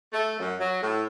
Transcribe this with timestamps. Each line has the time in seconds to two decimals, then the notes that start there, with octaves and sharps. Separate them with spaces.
0.13 A3
0.40 F#2
0.60 F#3
0.83 A2